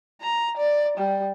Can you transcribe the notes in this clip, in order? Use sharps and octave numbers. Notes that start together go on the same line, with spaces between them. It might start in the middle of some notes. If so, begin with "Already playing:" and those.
A#5
D5
G3